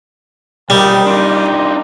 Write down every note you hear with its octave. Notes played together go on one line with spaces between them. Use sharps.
B1 G3 A#3 A#4 D#5 G5
A#3 D4 D#4 G4 C6